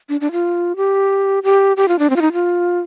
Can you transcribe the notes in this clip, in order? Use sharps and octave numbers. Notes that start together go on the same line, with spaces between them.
D4
D4
F4
G4
G4
G4
F4
D4
C4
F4
D#4
F4